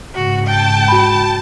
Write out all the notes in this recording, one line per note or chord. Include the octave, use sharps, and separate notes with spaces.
G#2 C#3 F#4
G5 A5
F#4 B5